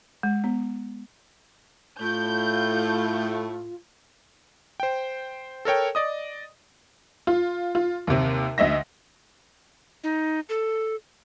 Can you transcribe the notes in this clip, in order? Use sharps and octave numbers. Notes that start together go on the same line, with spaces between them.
G#3
B3
A2 A3 F4 G6
C5 G5
A4 A#4 C#5 G5
D5 D#5 D#6
F4
F4
D#2 C3
D2 D#5 E5 A#6
D#4
A4